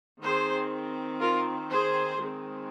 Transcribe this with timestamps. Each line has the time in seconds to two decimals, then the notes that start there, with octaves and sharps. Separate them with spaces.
0.23 D#3 C4 G#4 C5
1.20 F4 A#4
1.69 G#4 C5
2.19 D#3 G#3 C4